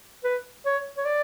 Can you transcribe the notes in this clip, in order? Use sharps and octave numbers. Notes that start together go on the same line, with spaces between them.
B4
C#5
C#5
D5